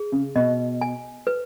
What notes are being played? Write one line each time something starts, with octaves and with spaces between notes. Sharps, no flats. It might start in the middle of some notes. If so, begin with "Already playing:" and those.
Already playing: G#4
C#3
B2 D#5
G#5
B4